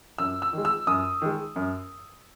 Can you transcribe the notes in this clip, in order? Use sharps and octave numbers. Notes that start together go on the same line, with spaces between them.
F#2 E6
E6
D#3 G#3
E6
F#2 D#6
D#3 G#3
F#2